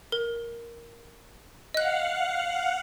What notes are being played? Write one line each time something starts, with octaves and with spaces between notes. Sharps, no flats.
A#4
D#5 F5 F#5 F#6